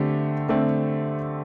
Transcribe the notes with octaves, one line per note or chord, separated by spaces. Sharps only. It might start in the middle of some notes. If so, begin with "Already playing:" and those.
Already playing: D3 A3 C4 G4
D3 A3 C4